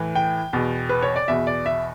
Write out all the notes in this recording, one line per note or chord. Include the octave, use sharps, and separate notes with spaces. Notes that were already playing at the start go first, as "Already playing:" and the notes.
Already playing: A2 E3
G5
E2 B2
B4
C#5
D5
E2 B2 E5
D5
E5